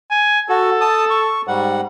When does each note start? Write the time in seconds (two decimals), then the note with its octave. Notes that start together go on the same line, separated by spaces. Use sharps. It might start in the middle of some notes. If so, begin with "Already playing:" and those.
0.11 G#5
0.49 F#4 A4
0.81 A5 D#6
1.10 C#6
1.48 G#2 G3 F#5